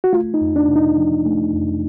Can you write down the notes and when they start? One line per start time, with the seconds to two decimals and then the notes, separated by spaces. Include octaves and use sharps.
0.04 F#4
0.13 A3 F4
0.34 D#4
0.41 F2
0.56 D4
0.69 C3
0.76 D#4
0.97 F3
1.26 A3
1.54 F2